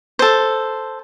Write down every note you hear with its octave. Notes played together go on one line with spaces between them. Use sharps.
A4 C5